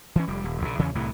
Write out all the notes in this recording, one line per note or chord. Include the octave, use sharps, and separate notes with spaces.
E3 C#4
F1 G3
D#1
A#1 C#3
E2 C#3 E3 C#4
C2 A2 C3 E3